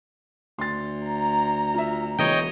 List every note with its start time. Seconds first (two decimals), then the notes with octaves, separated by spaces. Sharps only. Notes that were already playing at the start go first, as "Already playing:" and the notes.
0.59 D2 C6 A6
1.05 A#5
1.74 F4 E5
2.19 E1 E3 C#5 D#5 G5